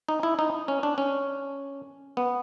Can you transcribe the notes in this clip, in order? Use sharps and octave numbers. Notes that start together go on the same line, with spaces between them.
D#4
E4
D#4
C#4
D4
C#4
B3